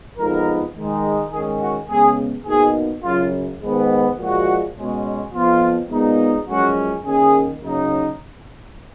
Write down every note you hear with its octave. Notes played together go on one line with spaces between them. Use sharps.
F2 F3 G#3 B3 D#4 A#4
D#3 G#3 D#4
D#3 G#3 C#4 G#4
F#4
C#3 G#3 B3 G#4
B2 A#3 D#4 G#4
F#2 C#3 F#3 F4
G#2 D#3 G#3 B3
A#2 F3 G#3 F#4
B2 G#3 C#4
F2 F3 B3 F4
A#2 G#3 B3 D#4
F#2 F3 G#3 C#4 F#4
D#3 A#3 C#4 G#4
C#3 F#3 A#3 D#4